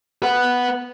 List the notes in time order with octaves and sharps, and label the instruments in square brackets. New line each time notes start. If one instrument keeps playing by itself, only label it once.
[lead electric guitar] B4 F#5